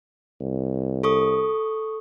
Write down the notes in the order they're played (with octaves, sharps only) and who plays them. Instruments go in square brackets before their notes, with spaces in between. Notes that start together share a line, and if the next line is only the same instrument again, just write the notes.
[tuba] C2
[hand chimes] A4 C#6 D#6